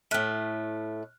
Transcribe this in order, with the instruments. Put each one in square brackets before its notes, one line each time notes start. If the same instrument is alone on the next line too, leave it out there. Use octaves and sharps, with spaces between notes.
[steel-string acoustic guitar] A2 A3 [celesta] F6 F#6